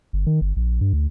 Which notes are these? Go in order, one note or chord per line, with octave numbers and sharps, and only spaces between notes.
G1
D#3
G1
A#1
G2
D2